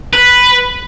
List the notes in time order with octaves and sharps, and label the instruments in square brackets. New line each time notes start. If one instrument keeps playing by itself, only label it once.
[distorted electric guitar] B4